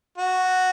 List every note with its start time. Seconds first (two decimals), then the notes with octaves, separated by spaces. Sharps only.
0.18 F#4